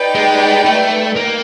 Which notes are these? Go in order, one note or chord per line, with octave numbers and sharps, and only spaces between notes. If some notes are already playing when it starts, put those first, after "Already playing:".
Already playing: D#4 G4 B4 D5 G5
G#3
A3
A#3